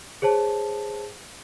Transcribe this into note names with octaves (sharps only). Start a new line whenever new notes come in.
G#4 C5 C#5 A5